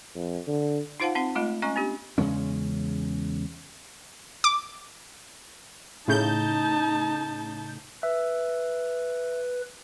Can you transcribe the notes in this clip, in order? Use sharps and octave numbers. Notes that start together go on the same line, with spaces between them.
F2
D3
D#4 F4 C5 F5 F#5 A5
C4 D#4 F#5
G#3 A3 F4 D#5 B5
G#3 C#4 D#5 G#5 C#6
B3 D4 G4
E2 C#3 G#3 C#4
D6
A2 C#3 D#4 A5 G6
B4 E5